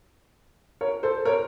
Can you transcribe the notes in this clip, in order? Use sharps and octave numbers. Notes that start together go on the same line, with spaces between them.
A#4 C#5
A4 C5
A#4 C#5